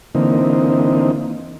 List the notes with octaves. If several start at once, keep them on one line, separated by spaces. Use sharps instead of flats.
D3 E3 A#3 C4 D#4